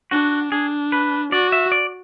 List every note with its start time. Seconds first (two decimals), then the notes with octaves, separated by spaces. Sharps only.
0.11 D4 F#4
0.52 D4 G#4
0.92 B4
1.32 F#4 D5
1.52 E5
1.72 D5